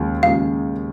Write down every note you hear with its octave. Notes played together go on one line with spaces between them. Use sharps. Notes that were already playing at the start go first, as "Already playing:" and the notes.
Already playing: D#2 C#3 F3 G#3
D#2 C#3 F3 G#3 F5